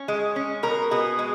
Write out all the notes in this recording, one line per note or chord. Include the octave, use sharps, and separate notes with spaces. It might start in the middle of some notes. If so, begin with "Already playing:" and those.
Already playing: C#4
G#3
C#4
B2 A#4
B2 G#4
G#3